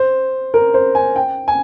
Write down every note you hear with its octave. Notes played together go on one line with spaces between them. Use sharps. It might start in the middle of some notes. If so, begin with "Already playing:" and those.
Already playing: C5
A#4
C5
G#5
G5
G#5